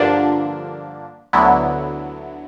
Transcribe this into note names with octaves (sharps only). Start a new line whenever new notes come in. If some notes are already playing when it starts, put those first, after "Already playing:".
Already playing: G2 D3 F3 A#3 D4
D2 D3 F#3 B3 E4